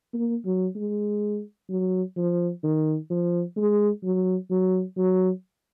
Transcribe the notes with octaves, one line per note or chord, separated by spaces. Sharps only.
A#3
F#3
G#3
F#3
F3
D#3
F3
G#3
F#3
F#3
F#3